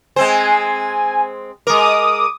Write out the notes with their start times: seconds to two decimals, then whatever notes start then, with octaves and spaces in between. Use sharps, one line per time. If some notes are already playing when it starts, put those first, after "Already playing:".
0.16 G#3 C4 C5 G#5
1.67 G#3 A#4 D6 D#6